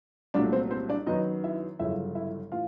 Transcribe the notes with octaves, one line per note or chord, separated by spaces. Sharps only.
C2 A#2 F#3 A3 D4 D5
C4 C5
C4 C5
D4 D5
F#2 D#3 F#3 B3 D#4 D#5
E4 E5
G1 F#2 C#3 F3 E4 E5
E4 E5
A2 E3 F4 F5